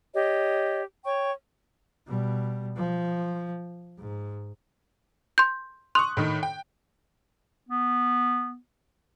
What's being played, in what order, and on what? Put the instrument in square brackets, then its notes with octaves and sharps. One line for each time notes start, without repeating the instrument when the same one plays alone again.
[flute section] G4 C#5 D#5
C#5 G5 C#6
[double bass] B2 G3
F3
G#2
[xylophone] C6 G6
[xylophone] C6 [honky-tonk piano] C#6 D#6 F#6
[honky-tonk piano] A2 D#3
G5
[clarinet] B3